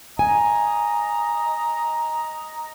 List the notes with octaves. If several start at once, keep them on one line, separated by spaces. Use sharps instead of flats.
D#5 G#5 A#5